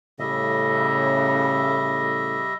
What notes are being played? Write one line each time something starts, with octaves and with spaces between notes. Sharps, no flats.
A2 C#3 G3 D#5 E5